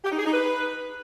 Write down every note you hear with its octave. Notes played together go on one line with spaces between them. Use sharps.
G4
D#4
G#4
D#4
B4